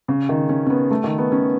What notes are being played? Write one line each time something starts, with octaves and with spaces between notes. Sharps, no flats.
C#3
D#3
C#4
C#4
B3
A3
D#3
B3
C#4